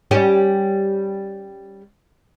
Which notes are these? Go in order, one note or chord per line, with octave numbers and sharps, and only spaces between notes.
G3 C#4 G4